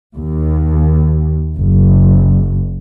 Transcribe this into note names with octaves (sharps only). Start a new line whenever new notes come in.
D#2
F#1